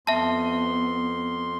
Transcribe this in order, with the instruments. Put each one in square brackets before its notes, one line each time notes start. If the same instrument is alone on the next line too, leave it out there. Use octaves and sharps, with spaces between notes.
[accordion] F2 C6 [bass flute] B3 [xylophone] E5 A5